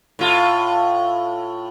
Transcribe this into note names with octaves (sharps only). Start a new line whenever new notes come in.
A2 F4